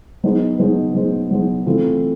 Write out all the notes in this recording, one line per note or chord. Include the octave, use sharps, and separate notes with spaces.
F#3 B3 D#4 G#4 C5
F#3 B3 D#4 G#4 C5
F#3 B3 D#4 G#4 C5
F#3 B3 D#4 G#4 C5
E3 A3 C4 F4